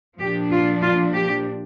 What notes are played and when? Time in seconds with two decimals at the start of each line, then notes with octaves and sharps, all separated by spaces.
0.20 A#2 F3 D4 G4
0.52 F4
0.83 F4
1.13 G4